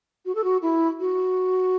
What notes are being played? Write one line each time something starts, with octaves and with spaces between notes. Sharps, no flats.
F#4
A4
F#4
E4
F#4